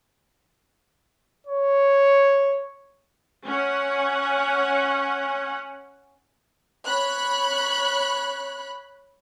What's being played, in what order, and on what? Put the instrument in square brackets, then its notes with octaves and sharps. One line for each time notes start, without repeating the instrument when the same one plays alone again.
[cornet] C#5
[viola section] C#4 F#5
[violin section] C#5 B5 F#6